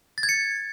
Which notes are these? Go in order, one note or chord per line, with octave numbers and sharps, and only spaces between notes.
A6
G#6
C#7
G#6